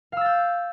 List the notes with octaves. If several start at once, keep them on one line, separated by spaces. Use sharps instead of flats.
F5 E6 G6 A6